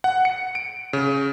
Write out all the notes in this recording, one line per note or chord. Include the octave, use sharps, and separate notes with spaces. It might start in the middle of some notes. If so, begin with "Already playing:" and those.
F#5
C#7
D7
C#3